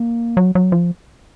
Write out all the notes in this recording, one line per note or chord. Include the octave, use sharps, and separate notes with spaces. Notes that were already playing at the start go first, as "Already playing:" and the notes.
Already playing: A#3
F#3
F#3
F3